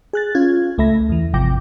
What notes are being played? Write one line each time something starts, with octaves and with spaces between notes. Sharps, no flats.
G#4 F#6 A6
C#4 F4 G#6
C#2 A3 E5 B5 A#6
E2 E3
G#1 C3 F3 G5 D6 A#6